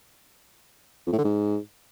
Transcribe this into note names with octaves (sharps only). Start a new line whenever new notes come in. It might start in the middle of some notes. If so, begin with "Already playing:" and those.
F2
A2
D3
G#2